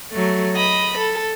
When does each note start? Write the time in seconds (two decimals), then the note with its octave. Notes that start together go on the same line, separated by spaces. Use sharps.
0.13 F#3 A3
0.56 D#5 B5
0.98 A4